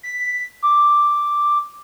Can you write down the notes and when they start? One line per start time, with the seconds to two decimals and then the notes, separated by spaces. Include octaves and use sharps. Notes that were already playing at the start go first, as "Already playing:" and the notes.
0.03 B6
0.63 D6